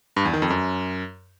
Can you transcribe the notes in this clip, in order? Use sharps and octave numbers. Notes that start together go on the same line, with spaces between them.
G2
E2
D#3
F2
F#2